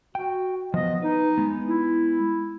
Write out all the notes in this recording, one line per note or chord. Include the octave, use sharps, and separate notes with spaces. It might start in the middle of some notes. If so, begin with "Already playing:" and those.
F#4 G5
F3 B3 D#5
D#4 B4
G#3 B3
E4